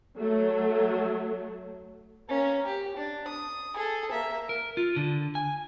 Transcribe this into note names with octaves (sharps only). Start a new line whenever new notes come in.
F#3 A3
A#3 C#4
G4
D4
D#6
G#4 A4
A#3 E5
A#4
F4
D3
G#5